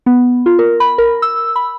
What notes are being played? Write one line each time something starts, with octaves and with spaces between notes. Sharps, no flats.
B3
F4
A#4
B5
A#4
E6
B5